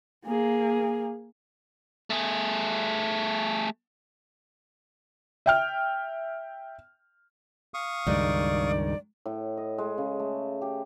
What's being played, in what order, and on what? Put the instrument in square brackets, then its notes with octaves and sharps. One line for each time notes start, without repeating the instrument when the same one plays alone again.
[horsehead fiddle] A#3 G#4
[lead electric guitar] A3 G#4
[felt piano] E5 G5 F6
[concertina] F5 C#6 D#6
[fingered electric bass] C#2 G2 [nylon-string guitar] D#3 G#3 [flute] D5
[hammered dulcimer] A2
D#5
G#3
C#3
A3
G4